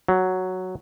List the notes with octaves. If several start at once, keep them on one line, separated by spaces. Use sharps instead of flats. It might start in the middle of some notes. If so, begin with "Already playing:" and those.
F#3